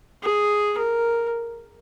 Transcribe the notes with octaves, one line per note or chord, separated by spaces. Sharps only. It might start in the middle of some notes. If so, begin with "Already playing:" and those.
G#4
A#4